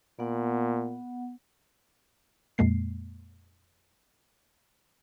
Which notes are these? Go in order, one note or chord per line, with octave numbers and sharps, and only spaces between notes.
A#2 B3 F#5
F2 A#2 G#3 A#3 C7